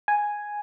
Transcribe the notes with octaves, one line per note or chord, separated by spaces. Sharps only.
G#5